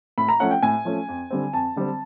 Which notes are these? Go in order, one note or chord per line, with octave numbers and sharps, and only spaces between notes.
A2 B5
A#5
F3 A3 C#4 F#5
G5
A2 G#5
F3 A3 C#4
F2
D3 G3 C4
F2 A5
D3 G3 C4